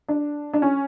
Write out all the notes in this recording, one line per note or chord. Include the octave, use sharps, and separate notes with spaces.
D4
D4
C#4